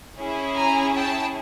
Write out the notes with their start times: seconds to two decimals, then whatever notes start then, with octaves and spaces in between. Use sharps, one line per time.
0.18 C#4 E4 G#4
0.57 G#5 A#5
0.95 G5 A5